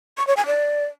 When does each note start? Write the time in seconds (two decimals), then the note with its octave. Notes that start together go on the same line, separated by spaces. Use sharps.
0.18 C#6
0.27 C#5
0.37 G#5
0.46 D5